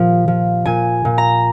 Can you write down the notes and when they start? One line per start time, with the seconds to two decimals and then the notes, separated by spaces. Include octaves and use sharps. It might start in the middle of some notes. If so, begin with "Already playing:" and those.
Already playing: A#2 F3
0.28 F3
0.65 A#2 G#5
1.05 A#2
1.18 A#5